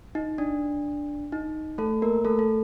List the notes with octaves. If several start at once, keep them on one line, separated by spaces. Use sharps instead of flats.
D#4
D4
D#4
A3 A4
A#3 A#4
A3 A4
A4